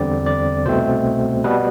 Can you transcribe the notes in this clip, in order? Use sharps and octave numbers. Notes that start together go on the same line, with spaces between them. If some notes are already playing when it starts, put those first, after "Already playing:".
Already playing: E2 D3 G3 C4 D5
D5
C2 B2 A3 C4 C5
B2 G3 B3 B4